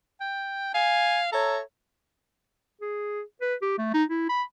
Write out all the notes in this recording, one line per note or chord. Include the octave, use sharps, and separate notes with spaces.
G5
F5 G#5
A4 C#5 E5 A#5
G#4
B4
G4
A3
D#4
E4
B5